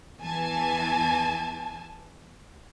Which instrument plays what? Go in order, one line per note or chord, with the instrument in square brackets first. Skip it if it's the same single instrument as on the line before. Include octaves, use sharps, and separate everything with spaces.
[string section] E2 E3 G#5 A5